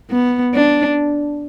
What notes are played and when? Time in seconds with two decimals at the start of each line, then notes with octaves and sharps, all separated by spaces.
0.10 B3
0.54 D4